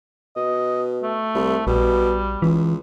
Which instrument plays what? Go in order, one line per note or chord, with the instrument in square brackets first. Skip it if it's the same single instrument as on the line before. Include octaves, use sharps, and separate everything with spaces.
[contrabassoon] B2 [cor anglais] D#5
[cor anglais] A3
[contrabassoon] C2
[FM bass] A#1 [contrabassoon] B2 [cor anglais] G3
[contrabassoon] C#2 [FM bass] E3